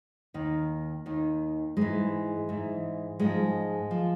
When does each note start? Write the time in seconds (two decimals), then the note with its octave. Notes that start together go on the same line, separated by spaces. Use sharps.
0.34 D#2 D#3
1.06 D#2 D#3
1.77 G#2 E3 G#3
2.49 G#2 E3
3.20 G#2 F3 G#3
3.91 F3